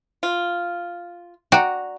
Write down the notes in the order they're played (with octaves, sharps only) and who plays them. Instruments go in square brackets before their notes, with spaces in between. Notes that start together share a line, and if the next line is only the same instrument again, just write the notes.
[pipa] F4
[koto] F#4 [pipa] D5 G5 A#5